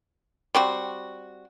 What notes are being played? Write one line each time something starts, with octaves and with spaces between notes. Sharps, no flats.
G3 C4 F#4